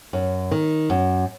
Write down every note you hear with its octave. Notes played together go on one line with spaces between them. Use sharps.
F#2
D#3
F#2